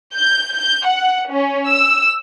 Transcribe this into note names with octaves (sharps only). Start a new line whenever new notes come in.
G6
G6
F#5
C#4
E6